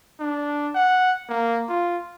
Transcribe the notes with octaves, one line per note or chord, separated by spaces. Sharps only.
D4
F#5
A#3
F4